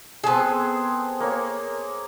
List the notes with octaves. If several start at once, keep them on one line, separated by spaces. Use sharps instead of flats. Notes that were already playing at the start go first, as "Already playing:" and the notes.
B3 C4 G#4 A4
A#3 C#5